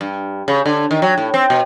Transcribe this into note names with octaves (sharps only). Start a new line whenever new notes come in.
G2
C#3
D3
D#3
F#3
A2
C4
B2